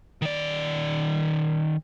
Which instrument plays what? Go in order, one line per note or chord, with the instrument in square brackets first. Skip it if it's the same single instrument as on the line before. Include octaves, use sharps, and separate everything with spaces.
[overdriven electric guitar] D#3 D5